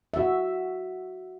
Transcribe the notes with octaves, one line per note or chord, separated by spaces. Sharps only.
F#4 E5